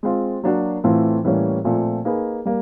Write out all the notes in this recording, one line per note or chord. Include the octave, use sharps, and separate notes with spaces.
G#3 C4 F4
F#3 A#3 D4 F#4
A2 E3 A3 C4 F4
A2 E3 G3 A#3 C#4
A#2 F3 A3 C4
A#3 D#4 G#4 B4
G3 A#3